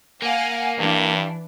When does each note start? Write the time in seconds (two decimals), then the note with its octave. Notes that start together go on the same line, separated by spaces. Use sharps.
0.22 A#3 F5 F#5 G#5
0.79 G2 E3 D4